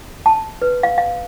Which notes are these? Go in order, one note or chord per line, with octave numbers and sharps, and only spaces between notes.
A5
B4
F5
F5